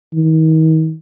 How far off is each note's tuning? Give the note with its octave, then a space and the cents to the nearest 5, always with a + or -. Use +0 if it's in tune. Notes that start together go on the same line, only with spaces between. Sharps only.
D#3 +40